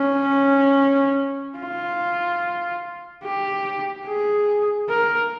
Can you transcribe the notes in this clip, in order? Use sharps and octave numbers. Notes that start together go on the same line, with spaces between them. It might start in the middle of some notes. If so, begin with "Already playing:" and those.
Already playing: C#4
F4
G4
G#4
A#4